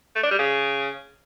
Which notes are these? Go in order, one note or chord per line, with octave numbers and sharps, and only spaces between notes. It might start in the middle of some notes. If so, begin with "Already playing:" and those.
A3
D4
G3
C#3